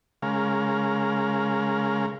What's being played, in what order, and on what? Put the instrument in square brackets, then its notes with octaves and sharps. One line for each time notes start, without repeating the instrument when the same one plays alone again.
[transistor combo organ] C#3 G#3 A#4 F5